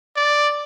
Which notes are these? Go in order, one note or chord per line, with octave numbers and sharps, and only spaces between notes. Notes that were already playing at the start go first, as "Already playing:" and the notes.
D5